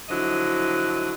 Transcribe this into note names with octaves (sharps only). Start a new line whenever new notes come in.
D3 F3 F#3 E4 D#5